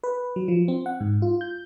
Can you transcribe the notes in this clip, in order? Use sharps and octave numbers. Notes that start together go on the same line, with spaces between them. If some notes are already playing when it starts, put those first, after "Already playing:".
B4
F#3
F3
C4
F#5
G#2
F4
G6